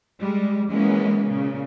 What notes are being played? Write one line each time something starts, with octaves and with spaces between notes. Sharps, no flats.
G3 G#3
E3 F#3 G#3 A#3 B3 C#4
A#2 C#3